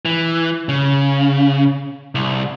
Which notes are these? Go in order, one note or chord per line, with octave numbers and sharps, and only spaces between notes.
E3
C#3
C2